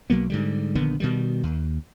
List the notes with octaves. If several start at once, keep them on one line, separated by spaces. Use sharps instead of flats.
B1 F#3 A#3 B3
G#2 D3 G3
A#1 D3 D#3 B3
B2 D#3 G3
D#2